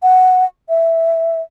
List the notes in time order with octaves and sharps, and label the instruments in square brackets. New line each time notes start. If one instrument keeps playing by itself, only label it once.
[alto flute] F#5
E5